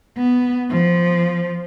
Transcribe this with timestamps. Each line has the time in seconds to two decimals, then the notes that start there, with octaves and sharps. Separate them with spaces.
0.18 B3
0.71 F3